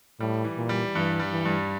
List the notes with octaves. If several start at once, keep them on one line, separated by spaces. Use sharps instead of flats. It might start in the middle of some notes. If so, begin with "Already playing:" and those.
A2 G3
E3
A#2
G3
G2 E3
G3
E3
G2